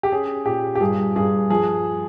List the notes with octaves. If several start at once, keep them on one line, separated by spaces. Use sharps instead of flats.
G4
C#4 G#4
A#2 G4
G4
G2 G#4
G2 G#4
F3 G#4